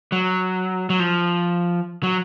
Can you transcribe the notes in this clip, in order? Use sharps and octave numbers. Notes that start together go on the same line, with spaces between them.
F#3
F#3
F3
F#3